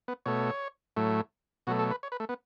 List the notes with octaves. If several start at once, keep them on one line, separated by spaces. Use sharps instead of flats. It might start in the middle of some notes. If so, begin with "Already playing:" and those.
B3
B2 A3 C#5
A2 F#3 A3
B2 F#3 A3 F#4
A4
B4
C#5
B4
A3
B3